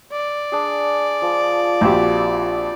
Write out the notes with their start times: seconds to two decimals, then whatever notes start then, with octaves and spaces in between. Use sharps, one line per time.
0.13 D5
0.52 D4 G#4
1.22 F3
1.81 A#1 C4 F#4 G4 A5